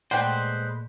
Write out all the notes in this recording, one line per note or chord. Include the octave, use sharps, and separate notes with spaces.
A#2 G#3 A3 B4 C5 D5 F#5 G5